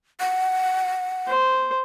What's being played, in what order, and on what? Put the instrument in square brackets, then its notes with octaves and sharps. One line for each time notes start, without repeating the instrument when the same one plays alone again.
[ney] F#5
[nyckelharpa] C5